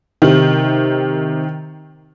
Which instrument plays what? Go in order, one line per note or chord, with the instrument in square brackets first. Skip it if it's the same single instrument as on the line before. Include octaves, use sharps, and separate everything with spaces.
[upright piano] C3 [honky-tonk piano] D#3